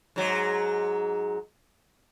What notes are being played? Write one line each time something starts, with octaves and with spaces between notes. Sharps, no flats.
G#2 F#3